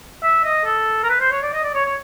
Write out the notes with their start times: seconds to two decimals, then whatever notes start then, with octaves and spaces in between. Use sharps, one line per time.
0.23 E5
0.44 D#5
0.65 A4
1.03 A#4
1.09 B4
1.20 C5
1.31 C#5
1.42 D5
1.53 D#5
1.63 D5
1.74 C#5
1.85 C#5